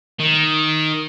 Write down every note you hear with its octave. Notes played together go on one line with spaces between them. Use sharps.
D#3